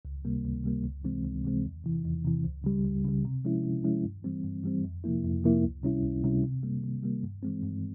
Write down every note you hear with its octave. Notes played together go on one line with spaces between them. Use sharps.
C#2
C3 G3 A#3
C#2
C3 G3 A#3
C#2
C3 E3 G#3 C4
C#2
C3 E3 G#3 C4
E2
C3 E3
E2
C3 E3
C#2
C#3 G3
C#2
C#3 G3
C3
F3 G#3 C#4 E4
C3
F3 G#3 C#4 E4
G2
E3 G3 C4
G2
E3 G3 C4
F2
C3 F3 A#3 E4
F2
C3 F3 A#3 E4
C#2
C3 G3 C#4 E4
C#2
C3 G3 C#4 E4
C3
G3 A#3
C3
G3 A#3
G2
E3 G#3 C4
G2